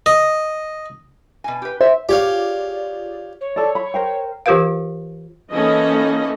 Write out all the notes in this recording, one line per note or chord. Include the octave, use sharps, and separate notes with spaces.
D#5
B2 G#5
G4 B4
C5 E5
F4 G4 G#4 C#5 D5 F5
C#5
A4 D5
B5
A#4 C5 G5
E3 F4 G4 A#4 B4 F5
E3 A#3 C#4 D#4 A4 D#5